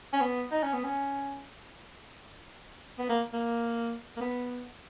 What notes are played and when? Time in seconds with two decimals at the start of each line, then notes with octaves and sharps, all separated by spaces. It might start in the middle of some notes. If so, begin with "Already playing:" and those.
0.13 C#4
0.21 B3
0.51 D#4
0.63 C#4
0.73 B3
0.84 C#4
2.98 B3
3.09 A#3
3.33 A#3
4.17 A#3
4.21 B3